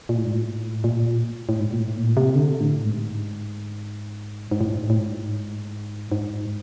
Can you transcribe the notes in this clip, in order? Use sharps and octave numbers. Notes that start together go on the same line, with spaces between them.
A#2
A2
G#2
A2
A#2
A2
G#2
A#2
A2
A#2
C3
D3
A2
G#2
G#2
A2
A2
G#2
G#2